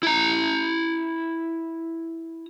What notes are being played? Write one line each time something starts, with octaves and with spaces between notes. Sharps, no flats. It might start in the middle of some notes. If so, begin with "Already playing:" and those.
E4 A#5